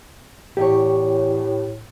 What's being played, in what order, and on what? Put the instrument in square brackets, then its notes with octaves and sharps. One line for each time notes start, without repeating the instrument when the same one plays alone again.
[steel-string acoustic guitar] E2 C#5 [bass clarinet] A2 [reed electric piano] G4